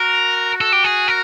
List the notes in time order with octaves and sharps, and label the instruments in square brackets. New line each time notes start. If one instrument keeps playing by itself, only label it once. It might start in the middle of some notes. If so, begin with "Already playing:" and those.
Already playing: [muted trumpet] F#4 [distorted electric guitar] A#4
[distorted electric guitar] A4
G4
G#4
A#4